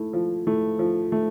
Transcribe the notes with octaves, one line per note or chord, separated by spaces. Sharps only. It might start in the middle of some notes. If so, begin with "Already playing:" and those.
Already playing: A3 E4
F3
A3 E4
F3
A3